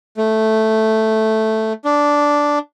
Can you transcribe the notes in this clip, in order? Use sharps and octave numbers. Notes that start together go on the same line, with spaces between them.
A3
D4